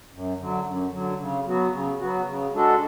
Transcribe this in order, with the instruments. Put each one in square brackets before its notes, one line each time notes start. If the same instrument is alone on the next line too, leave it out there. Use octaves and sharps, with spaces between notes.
[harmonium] F#2
D3 F#3
F#2
D3 F#3
C#3
F#3 B3 F#4
C#3
F#3 B3 F#4
C#3
G#3 D4 F#4 A4